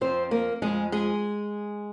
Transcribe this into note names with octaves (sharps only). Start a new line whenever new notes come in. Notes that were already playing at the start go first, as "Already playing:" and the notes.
F2 F3 C4 C5
A#3 A#4
F2 F3 G#3 G#4
G#3 G#4